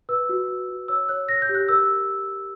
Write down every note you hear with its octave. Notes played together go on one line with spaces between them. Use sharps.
B4 E6
F#4
F#4
F#4
C#5 E6
C#5 F#6
C#5 A#6
G6
G4
F#6
A#4 E6